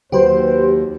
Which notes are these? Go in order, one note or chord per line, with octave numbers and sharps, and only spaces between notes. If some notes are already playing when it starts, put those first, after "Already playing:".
D#2 F#3 G4 B4 C5